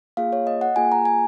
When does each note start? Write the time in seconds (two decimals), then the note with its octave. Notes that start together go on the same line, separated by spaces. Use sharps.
0.17 A#3 F4 G#4 F5
0.33 C#5
0.47 D#5
0.61 F#5
0.76 A#3 F4 G#4 G#5
0.92 A#5
1.05 G#5